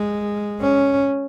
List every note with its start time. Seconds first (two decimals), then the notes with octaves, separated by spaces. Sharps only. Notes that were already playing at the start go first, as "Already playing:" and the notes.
Already playing: G#3
0.61 C#4